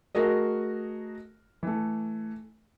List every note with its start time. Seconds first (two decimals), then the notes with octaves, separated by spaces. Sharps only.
0.15 A3 F#4 G#4 A#4 D#5
1.63 E3 A3